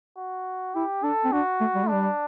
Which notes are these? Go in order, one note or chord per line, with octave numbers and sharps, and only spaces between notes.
F#4
E4 G4
D4 A4
C4
D4 F#4
A3
G3
A3
G3 D4